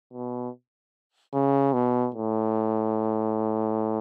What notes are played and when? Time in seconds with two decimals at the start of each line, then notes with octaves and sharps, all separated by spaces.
0.13 B2
1.34 C#3
1.73 B2
2.14 A2